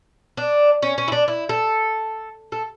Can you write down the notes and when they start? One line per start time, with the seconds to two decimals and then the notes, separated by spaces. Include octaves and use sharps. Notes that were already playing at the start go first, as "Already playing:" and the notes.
0.37 D4
0.82 C#4
0.98 C#4
1.08 E4
1.12 D4
1.28 E4
1.49 A4
2.52 A4